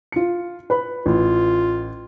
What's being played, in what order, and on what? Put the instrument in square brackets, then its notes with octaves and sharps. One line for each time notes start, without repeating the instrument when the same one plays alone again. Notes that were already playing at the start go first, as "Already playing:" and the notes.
[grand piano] F4 C#7
B4 B5
[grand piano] A1 [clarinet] F4